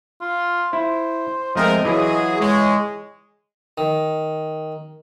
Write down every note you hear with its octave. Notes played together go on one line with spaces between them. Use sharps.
F4
E4 C5
F3 G#3 A3 C4 A#4 D#5
E3 F#3 E4 F4 G#4
G#3 C#5
D#3